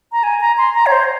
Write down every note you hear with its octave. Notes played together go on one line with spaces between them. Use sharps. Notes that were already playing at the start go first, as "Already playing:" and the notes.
A#5
G#5
A#5
C6
A#5
C#5
C5